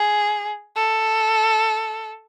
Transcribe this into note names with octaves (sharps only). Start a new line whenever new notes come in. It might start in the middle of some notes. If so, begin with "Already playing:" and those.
Already playing: G#4
A4